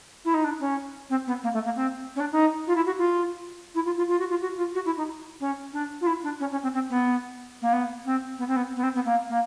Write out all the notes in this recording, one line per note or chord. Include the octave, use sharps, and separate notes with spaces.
E4
D#4
D4
C#4
C4
B3
A#3
A3
A#3
C4
C#4
D4
D#4
F4
E4
F#4
F4
E4
F4
F4
F4
F#4
F4
F#4
F4
F#4
E4
D#4
C#4
D4
F4
E4
D4
C#4
C#4
C4
C4
B3
A#3
B3
C4
B3
C4
B3
B3
C4
B3
A#3
A#3